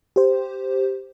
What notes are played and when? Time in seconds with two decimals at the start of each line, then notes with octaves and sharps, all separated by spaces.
0.16 G4 C5